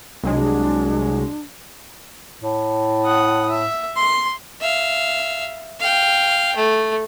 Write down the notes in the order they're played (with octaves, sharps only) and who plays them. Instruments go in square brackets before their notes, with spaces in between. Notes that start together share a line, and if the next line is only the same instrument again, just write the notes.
[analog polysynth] C2 F#3 G#3 [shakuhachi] D4
[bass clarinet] A2
[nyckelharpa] F#5 D#6
E5
C6
[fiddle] E5 F5
F5 G5
A3